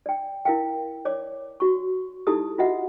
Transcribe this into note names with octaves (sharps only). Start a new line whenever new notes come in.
D5 G5
E4 A#4 F5 G5
C#5 D5 D6
F#4 C#6
D#4 E4 G4 A4 D#6
F4 F#4 D#5 E5 F#5